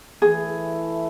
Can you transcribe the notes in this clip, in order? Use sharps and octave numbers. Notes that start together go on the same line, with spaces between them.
E3 A3 E4 G#4